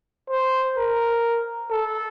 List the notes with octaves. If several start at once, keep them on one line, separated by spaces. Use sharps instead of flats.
C5
A#4
A4